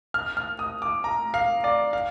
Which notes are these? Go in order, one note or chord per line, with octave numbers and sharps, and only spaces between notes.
F6
F6
D#6
D6
A#5
F5
D5
F5